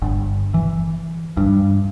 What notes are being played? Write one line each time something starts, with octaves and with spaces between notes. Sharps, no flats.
G1
E3
G2